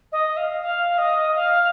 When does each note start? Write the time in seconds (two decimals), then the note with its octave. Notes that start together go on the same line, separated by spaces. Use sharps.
0.12 D#5
0.37 F5
0.61 F5
0.98 D#5
1.35 F5